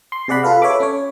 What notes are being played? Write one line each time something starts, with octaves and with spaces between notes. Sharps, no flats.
C6
C3 G#4 D5 F#5 B5
F4 A4 B4 F5
A4 C#5 E5 B5 D6
C#4 C#5